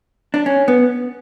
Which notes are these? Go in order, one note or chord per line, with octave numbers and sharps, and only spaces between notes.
D4
C#4
B3